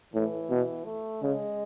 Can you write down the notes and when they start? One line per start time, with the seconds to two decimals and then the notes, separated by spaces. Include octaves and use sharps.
0.14 A2 E3
0.50 B2
0.85 A3
1.22 C#3 G#3